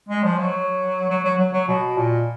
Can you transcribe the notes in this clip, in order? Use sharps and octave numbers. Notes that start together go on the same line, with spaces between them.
G#3
F3
F#3
F#3
F#3
F#3
F#3
B2
A#2